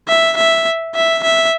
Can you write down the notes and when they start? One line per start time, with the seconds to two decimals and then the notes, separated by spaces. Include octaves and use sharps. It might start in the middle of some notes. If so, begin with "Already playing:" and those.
0.08 E5
0.37 E5
0.95 E5
1.23 E5